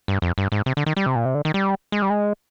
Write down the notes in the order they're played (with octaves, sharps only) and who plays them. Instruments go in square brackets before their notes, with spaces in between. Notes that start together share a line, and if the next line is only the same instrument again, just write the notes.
[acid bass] G2
F2
G2
G#2
C3
D3
D#3
G3
C3
A#2
C3
D3
D#3
G3
G#3
G3
G#3